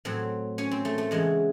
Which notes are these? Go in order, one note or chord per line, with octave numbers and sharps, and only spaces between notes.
A2 F#3 C4
C#4
C4
A3
A3
E2 C#3 E3 G#3